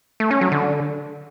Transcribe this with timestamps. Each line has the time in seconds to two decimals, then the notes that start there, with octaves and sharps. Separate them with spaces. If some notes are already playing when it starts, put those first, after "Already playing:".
0.20 A3
0.31 C#4
0.41 F#3
0.52 D3